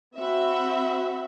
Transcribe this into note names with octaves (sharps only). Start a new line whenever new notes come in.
C4 F#4 E5 B5